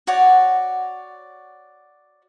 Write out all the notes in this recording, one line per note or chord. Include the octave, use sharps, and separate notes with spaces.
F#4 C#5 D5 F#5